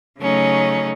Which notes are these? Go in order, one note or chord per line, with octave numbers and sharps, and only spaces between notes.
C#3 F#3 A3 C#4 D#4